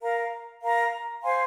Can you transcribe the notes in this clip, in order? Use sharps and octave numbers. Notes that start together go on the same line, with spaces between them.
A#4 F5 A#5
A#4 F5 A#5
C5 F5 G#5 C6